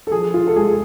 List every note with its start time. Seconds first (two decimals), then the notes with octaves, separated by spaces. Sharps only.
0.07 A4
0.11 F3 G#4
0.34 F4
0.47 A4
0.56 G#3 G#4